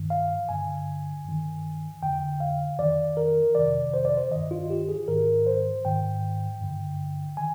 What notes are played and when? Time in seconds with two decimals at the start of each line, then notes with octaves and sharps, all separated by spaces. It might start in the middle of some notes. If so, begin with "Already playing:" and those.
Already playing: G2 D#3
0.10 F5
0.49 G2 D3 G#5
1.25 G2 D#3
2.02 F2 D3 G5
2.40 F5
2.79 F2 D#3 D5
3.17 A#4
3.55 F2 C3 D#3 D5
3.94 C5
4.05 D5
4.17 C5
4.31 G2 D#3 D#5
4.51 F4
4.70 G4
4.89 G#4
5.08 G#2 D#3 A#4
5.47 C5
5.85 G#2 D#3 G5
6.61 G2 D3
7.37 D#3 G#5